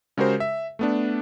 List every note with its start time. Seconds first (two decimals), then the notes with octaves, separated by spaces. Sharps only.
0.17 C#3 G#3 F#4 G4 A#4 C5
0.40 E5
0.79 A3 B3 D4